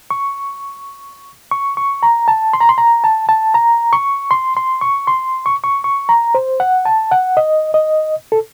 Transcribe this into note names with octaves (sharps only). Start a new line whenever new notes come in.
C#6
C#6
C#6
A#5
A5
C6
A#5
C6
A#5
A5
A5
A#5
C#6
C6
C6
C#6
C6
C#6
C#6
C#6
A#5
C5
F#5
A5
F#5
D#5
D#5
A4